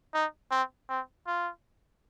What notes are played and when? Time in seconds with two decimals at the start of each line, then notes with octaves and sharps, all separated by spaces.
0.14 D#4
0.51 C4
0.89 C4
1.27 F4